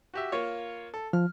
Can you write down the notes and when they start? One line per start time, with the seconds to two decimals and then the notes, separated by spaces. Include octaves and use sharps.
0.14 F#4 G4 E5
0.32 A#3 F4 C#5
0.94 A4
1.13 F3 F6